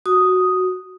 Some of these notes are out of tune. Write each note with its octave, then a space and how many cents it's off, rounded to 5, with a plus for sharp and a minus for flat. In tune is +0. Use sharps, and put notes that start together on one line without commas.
F#4 +0 D#6 +0